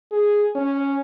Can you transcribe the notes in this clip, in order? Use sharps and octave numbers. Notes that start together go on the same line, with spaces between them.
G#4
C#4